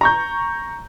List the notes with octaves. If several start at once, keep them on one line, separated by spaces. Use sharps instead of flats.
A#5 C#6 G6